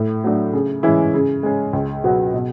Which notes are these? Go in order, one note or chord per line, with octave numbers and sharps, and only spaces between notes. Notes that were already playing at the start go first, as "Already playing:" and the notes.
Already playing: A2
F#3 A3 D4
C#3
E3 G#3 C#4 E4
C#3
G#3 C#4
C#2
B2 F#3 B3 F#4
B2